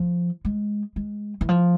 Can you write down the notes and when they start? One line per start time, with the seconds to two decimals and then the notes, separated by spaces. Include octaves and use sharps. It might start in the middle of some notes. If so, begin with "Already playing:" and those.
Already playing: F3
0.45 G#3
0.96 G#3
1.41 E3
1.49 F3